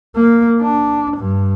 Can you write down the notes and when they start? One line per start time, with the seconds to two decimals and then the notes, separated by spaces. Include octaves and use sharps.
0.16 A#3
0.61 D4
1.17 G2